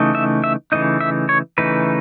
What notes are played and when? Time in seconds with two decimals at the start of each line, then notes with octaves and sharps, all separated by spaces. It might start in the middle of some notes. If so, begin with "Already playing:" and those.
Already playing: C#3 E3 A3 D#4
0.15 E5
0.44 E5
0.72 C#3 E3 A3 D#4 D#5
1.01 E5
1.29 C#5
1.58 C#3 E3 A3 D#4 B4